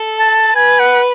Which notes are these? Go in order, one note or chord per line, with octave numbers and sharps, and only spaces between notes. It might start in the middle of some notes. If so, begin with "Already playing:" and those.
Already playing: A4
A5
B4 G#5
F#5